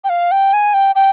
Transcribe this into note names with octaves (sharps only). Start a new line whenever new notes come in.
G5
F5
G5
G#5
G5
G5